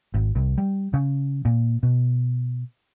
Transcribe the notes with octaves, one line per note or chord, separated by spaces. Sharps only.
G#1
C2
G3
C#3
A#2
B2